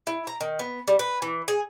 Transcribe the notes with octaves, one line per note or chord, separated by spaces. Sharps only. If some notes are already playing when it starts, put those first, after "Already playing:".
E4
A#5
D#3
B3
G3
B4
E3
G#4